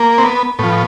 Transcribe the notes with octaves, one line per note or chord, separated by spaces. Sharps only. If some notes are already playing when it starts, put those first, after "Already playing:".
Already playing: A#3
C4
B3
A2 F3 B3